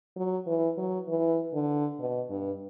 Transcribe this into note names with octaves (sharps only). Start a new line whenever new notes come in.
F#3
E3
F#3
E3
D3
B2
G2